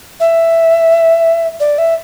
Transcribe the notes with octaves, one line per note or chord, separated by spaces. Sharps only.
E5
D5
E5